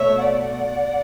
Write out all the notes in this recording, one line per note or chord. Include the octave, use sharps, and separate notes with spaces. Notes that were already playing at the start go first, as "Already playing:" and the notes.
Already playing: B2 A3 C#5 E5
D5 F#5